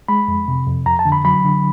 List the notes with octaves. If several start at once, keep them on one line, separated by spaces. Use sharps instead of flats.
G#3 B5
F2
C3
F2
F2 A#5
A5
D3
B5
F#3 B5
D3